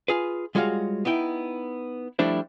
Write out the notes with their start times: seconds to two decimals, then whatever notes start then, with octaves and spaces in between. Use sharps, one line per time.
0.08 F4 G#4 B4
0.55 G3 G#3 F4 F#4 C#5 F5
1.05 B3 D#4 E4 G5
2.19 F3 G3 A3 D4 E4 C5